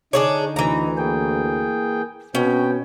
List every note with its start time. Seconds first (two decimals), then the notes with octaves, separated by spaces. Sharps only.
0.13 D3 D4 D#4 G#4 C#5
0.56 D2 E3 A#5
0.98 A#3 G#4 G5
2.35 B2 C4 C#4 G5